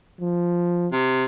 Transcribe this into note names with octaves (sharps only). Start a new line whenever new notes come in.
F3
C3